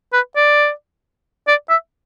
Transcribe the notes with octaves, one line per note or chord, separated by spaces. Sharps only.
B4
D5
D5
E5